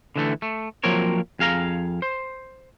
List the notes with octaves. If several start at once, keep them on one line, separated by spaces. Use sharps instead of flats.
D3 E3 A3
A3
F3 F#3 A#3 C4 A#4 C#5
F2 G#4 F5 A#5
C5